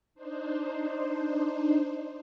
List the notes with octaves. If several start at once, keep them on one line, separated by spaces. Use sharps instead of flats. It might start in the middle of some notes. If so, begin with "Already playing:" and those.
D4 D#4 C5